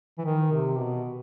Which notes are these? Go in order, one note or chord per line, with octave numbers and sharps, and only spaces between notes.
E3
D#3
C3
B2